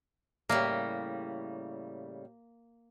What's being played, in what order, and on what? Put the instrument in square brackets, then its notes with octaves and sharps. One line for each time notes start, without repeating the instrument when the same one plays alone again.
[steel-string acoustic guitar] A2 C#3 G3 [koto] A#3